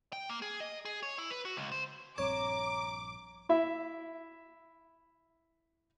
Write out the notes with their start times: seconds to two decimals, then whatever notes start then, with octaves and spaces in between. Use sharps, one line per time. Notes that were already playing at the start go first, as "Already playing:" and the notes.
0.13 G5
0.29 A#3
0.42 G#4
0.60 D#5
0.85 G#4
1.03 C#5
1.18 E4
1.31 B4
1.45 F#4
1.57 C#2
1.72 C5
2.18 A#1 G2 C4 C#5 A#5 D6
3.49 E4 E5